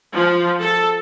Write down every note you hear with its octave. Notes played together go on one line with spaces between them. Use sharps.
F3
A4